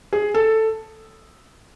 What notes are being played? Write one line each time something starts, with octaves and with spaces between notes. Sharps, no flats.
G#4
A4